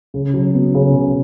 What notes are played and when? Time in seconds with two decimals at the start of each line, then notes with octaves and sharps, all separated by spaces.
0.14 C#3
0.34 F#3
0.54 B3
0.74 C#3
0.95 C#3